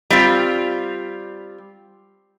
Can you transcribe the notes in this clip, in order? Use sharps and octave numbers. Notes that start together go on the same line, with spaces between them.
G3 C4 F4